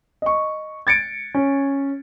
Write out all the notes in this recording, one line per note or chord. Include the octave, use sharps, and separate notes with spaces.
D#5 C#6
G#6 A6 C#7 D7
C#4